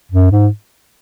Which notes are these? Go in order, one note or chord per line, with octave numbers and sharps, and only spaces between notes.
F#2
G#2